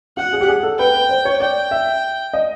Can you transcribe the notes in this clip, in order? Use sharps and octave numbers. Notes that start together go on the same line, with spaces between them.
F#4 F#5
G#4
G4
G#4
A4
B4 G5
B4
C5
C#5
D5 G5
E5
D#5